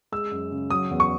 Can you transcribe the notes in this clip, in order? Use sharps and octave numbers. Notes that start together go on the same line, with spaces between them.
G#3 E6
F#2
C#3
F#3 D#6
E2
C#6